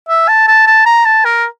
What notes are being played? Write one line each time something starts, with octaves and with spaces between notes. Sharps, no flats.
E5
A5
A5
A5
A#5
A5
A#4